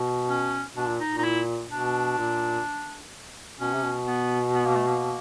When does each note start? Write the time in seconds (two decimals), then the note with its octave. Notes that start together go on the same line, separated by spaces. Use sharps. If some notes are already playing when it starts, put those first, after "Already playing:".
Already playing: B2
0.30 C#4
0.77 B2 D4
0.88 A#2
1.00 D#4
1.10 A#2
1.18 D#4
1.24 E4
1.71 B2 D4
2.18 A#2
3.60 B2 C#4
3.73 C3
3.84 B2
4.07 B3
4.55 B3
4.65 A#3
4.76 A3
4.87 A#3